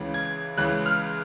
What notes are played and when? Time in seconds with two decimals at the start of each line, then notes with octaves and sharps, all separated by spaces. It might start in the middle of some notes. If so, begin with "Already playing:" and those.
Already playing: C#2 C#3 E3
0.14 G#6
0.57 C#2 C#3 E3 F#6
0.86 F6